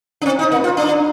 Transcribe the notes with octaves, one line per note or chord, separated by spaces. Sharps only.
D4
C4
D#4
A#3
F4
D4